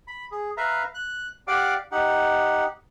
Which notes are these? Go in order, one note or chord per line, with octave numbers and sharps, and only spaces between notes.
B5
G#4
B4 E5 F5 A#5
F#6
G4 D5 F5 F#5 D6
D#4 G4 F#5